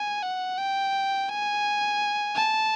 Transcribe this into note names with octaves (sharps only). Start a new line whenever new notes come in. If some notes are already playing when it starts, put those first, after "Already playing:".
Already playing: G#5
F#5
G5
G#5
A5